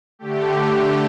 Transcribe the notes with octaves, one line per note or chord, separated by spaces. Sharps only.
D3 A3 G4